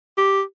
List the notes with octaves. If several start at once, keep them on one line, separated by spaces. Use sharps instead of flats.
G4